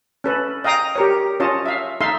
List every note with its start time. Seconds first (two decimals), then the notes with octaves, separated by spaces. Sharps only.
0.24 C#4 A4 B4
0.64 D#5 F5 G5 A#5 D#6
0.96 G4 A#4 C#5
1.40 C#4 F4 C#5 D#5 A5
1.66 E5 F5
2.01 D#4 A4 E5 F5 C6